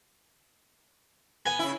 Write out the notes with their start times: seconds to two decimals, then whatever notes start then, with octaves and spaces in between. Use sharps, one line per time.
1.46 B3 G#5
1.59 C#3 E4